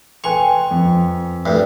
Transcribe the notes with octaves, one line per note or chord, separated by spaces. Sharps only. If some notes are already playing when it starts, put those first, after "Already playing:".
A4 B4 G5 G#5 C6 C#6 F7
F2
D2 G2 E5